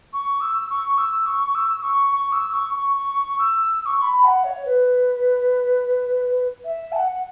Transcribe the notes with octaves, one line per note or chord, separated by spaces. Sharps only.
C#6
E6
C#6
E6
C#6
E6
C#6
C#6
E6
C#6
C#6
C#6
E6
E6
C#6
B5
F#5
C#5
B4
E5
A5
F#5